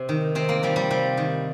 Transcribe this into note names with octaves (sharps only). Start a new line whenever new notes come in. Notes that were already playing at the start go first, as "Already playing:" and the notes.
Already playing: C3
D#3
C3 C4
A#3
F3 G3
G3
C3 G3
D#3